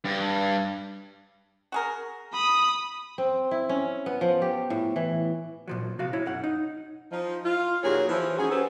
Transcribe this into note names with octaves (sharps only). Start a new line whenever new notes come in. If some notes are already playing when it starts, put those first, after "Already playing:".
G2
F#4 G#4 A#4
B5 D#6
C4
E4
C#4
B3
F3
G4
A2
E3
A#2 F3 F#3
C3 F#4 F5
E4 C#5
B1 F#2 F#5
D#4
F3 D#4
F4
D#2 A#2 F#3 G#4 C#5
E3 F3
C#4 D#4 F#4 G#4
C#4 F#4 G4 A4 B4 C5